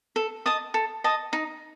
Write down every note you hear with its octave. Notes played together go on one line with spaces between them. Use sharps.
A4
D#5 A5 D#6
A4
D#5 A5 D#6
D#4